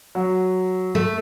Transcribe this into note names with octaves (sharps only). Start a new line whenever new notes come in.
F#3
A3